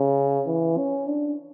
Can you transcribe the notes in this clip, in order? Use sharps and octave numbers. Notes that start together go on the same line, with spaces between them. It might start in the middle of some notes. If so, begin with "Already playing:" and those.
Already playing: C#3
E3
C#4
D4